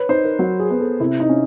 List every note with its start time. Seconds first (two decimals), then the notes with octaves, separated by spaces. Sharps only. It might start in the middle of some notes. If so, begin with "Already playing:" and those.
Already playing: B4 C#5
0.09 D#4 C5
0.24 A#4
0.39 F#3
0.60 G#4
0.70 B3
0.80 A4
1.00 C3 E4
1.20 D#4
1.29 C#4